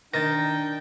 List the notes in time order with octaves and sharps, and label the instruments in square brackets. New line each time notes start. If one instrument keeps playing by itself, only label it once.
[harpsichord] D#3 [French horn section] D4 [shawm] G5 [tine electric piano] A6 A#6